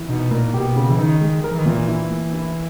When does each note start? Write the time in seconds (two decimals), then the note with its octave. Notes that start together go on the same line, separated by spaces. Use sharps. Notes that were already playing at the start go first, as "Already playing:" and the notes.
Already playing: E3
0.09 B2 D#4
0.31 A#2 A#3
0.53 B2 G4
0.76 C#3
0.90 E3
0.99 D#3 D#4
1.21 G#3
1.44 A#4
1.51 E3
1.59 D#3
1.66 A#2 E3
1.88 E4
2.10 A#3
2.33 E4